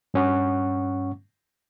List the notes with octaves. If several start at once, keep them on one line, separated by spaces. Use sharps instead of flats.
G2 C#4 F#5 C#6